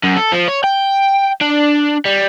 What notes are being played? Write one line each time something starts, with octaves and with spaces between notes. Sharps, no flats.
F#2
A4
F3
C#5
G5
D4
G3